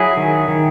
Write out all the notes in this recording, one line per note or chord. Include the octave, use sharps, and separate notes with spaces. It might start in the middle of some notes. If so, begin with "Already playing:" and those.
Already playing: F#3 E4 G#4
D#3
D#3